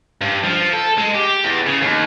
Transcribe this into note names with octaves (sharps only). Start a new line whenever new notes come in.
G2
F3
A4
G#3
G4
E2
C#3
D#2